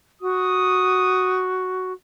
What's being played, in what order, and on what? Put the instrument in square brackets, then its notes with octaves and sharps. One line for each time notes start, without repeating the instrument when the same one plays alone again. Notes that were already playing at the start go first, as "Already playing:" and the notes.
[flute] F#4 [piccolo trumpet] D#6